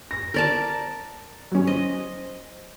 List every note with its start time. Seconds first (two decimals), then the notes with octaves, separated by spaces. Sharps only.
0.11 A#6
0.34 A#4 D5 A5
1.52 F#3 C#4
1.67 C5 D#5